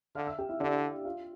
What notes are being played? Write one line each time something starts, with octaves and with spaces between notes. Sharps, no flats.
D3 F5 F6
E5 E6
G4 G5
E4 E5
D3 D4 D5
F4 F5